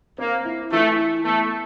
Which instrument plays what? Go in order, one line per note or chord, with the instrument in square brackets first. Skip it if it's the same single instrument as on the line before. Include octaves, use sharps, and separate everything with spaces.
[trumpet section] A#3 [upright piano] C4
[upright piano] E4
[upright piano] E3 [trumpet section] A3
[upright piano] E4
[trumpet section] A3 [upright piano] B3